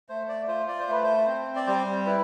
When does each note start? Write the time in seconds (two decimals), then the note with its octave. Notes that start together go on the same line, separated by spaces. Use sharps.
0.09 A3 C5
0.29 D5
0.48 F4 C5
0.68 D5
0.79 C5
0.88 A3 B4
1.03 C5
1.27 C4
1.56 D5
1.67 G3 C5
2.06 E4 B4